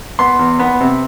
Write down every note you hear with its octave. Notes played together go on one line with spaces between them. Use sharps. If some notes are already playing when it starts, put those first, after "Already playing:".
B3 C6
E2
B3
C3